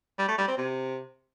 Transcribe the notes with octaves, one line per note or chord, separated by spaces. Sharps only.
G3
A3
G3
C4
C3